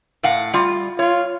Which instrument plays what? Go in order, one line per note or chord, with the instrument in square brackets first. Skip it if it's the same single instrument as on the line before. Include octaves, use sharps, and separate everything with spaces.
[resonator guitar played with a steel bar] A2 F5 F#5
G3 F4
[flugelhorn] F4 [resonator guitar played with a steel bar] C#5